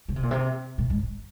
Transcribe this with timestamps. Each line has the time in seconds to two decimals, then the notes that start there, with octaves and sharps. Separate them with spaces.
0.09 C#3
0.16 C3
0.23 A#2
0.31 C3
0.78 A#2
0.90 G#2